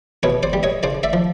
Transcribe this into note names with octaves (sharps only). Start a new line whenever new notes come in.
B2 B4 C#5
C5 D5
G3
C#5 D#5
C#3 C5 D5
D5 E5
F3